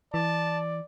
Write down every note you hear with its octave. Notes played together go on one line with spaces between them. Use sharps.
E3 D5 A5